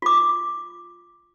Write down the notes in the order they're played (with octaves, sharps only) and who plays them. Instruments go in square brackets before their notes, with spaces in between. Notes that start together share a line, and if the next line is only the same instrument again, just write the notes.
[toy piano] F4 D6